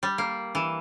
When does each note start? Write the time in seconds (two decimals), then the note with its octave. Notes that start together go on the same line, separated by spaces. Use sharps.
0.03 G3
0.18 A#3
0.55 E3